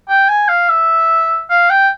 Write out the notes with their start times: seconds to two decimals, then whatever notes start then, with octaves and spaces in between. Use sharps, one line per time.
0.09 G5
0.29 G#5
0.48 F5
0.69 E5
1.50 F5
1.70 G5